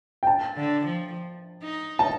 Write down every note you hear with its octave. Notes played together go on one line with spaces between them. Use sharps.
G5
A5
D3
F3
D#4
A5